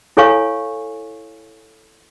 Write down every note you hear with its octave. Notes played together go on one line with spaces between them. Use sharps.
E4 A4 C#5 F5 G#5 C#6